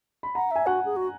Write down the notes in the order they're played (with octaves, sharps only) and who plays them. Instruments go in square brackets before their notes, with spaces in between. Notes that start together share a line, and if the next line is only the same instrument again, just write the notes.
[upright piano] B5
[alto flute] F#5 [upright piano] A#5
[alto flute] E5 [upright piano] G#5
[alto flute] F#4 [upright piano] F#5
[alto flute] G#4
F#4